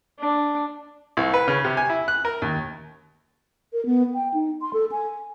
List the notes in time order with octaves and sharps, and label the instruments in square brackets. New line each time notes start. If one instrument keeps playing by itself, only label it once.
[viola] D4
[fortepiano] C2
B4
C#3
C3
G#5
E4
F#6
A#4
D#2
[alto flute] A#4
B3
G5
D#4
C6
A4
G#5